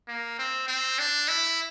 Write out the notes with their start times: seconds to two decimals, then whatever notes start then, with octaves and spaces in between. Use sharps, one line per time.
0.08 A#3
0.38 C4
0.68 C4
0.99 D4
1.28 E4